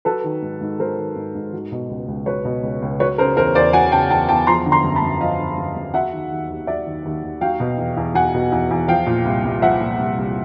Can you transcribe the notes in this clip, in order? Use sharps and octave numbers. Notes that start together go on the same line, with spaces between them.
F#3 A4 B4
D#3
G#2
G#2
F#3 A#4 C5
D#3
G#2
G#2
F#3
B2
C#2
C#2
F#3 B4 C#5
B2
C#2
C#2
F#3 B4 C#5
C#3 A#4 C5
E2 A#4 C5
E2 C5 D5
F#3 F#5 G#5
C#3 G5 A5
E2 G5 A5
E2 G5 A5
F3 A#5 C6
D3
A#5 C6
F#2
A5 B5
F#2
F3 D#5 F5
D3
F#2
F#2
F#3 E5 F#5
D#3
D#2
D#2
F#3 D5 E5
D#3
D#2
D#2
F#3 F5 G5
B2
E2
E2
F#3 F#5 G#5
B2
E2
E2
F3 F5 G5
A#2
C2
C2
F3 E5 F#5
A#2
C2
C2